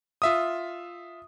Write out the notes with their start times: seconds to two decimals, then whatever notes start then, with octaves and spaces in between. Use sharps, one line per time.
0.22 F4 E5 D#6